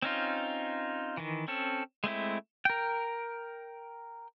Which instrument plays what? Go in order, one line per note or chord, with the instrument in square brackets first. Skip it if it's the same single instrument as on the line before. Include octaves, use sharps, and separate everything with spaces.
[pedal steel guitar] C4 C#4 D#4 F4
D#3 E3
C4 C#4 A4
G#3 A3 C4 E4
A#4 G5